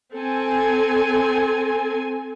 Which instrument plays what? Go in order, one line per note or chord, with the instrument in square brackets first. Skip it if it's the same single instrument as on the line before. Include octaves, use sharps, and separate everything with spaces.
[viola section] C4 A4 G#5